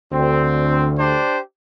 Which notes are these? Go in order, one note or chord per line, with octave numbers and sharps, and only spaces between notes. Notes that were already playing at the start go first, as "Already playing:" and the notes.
D2 C4
D4 G4 C5